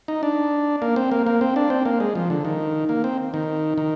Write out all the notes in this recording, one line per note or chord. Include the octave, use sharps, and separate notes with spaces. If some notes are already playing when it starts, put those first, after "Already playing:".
D#4
D4
A#3
C4
A#3
A#3
C4
D4
C4
A#3
G#3
F3
D3
D#3
A#3
C4
D#3
D#3